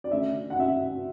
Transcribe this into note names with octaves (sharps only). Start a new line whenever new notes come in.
D5
D3 A3 C#4 E5
F#5
E5